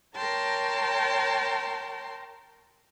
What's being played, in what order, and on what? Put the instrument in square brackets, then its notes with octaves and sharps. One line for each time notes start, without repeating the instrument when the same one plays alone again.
[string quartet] A#4 C#5 G5 A5 A#5 C6